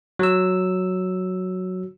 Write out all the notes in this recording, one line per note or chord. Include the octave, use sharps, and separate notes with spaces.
F#3 E6